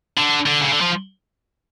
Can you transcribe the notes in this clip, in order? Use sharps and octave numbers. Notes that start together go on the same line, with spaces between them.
D3
D3
C#3
D3
F3